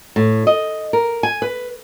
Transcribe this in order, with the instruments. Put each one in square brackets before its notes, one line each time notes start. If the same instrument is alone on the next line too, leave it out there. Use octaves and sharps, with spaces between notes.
[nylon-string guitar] A2
D#5
A#4
G#5
B4